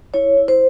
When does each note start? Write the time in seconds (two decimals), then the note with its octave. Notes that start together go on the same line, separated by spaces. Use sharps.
0.14 E4 C#5
0.37 E4
0.48 C5